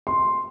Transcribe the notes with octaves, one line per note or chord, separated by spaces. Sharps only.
C6